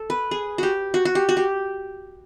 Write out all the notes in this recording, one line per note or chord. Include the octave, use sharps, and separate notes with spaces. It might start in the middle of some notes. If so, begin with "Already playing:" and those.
Already playing: A4
B4
G#4
F#4 G4
F#4
F#4
G4
F#4
G4